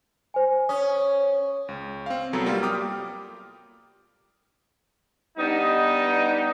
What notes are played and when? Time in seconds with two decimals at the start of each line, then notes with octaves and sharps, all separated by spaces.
0.34 C5 G#5
0.69 C#4 D#6
1.68 C#2
2.06 C4 F5
2.33 C2 F#3 B3 A4 A#5
2.46 G3 A#3 F4 G4
2.63 G5 D6 D#6 F6
5.38 G3 B3 D4 D#4